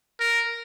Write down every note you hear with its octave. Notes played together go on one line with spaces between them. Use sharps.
A#4